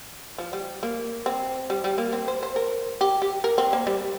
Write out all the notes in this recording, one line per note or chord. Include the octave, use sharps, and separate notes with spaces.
F3
G3
A#3
C4
G3
G3
A#3
C4
C5
C5
A#4
G4
G4
A#4
C4
A#3
G3